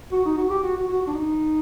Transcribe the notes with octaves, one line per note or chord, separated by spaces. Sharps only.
F#4
D#4
F#4
G4
F#4
F#4
F#4
F#4
D4
D#4